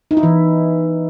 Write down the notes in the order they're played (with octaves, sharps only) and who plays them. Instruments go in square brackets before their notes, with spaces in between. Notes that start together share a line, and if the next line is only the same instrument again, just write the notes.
[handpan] D#4
E4
E3